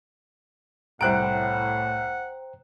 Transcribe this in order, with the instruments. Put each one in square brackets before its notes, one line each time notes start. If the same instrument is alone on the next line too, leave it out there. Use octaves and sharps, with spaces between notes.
[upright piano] C2 F#6 D7 [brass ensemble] A2 [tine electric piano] C5 G5 A#5 [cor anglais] F#5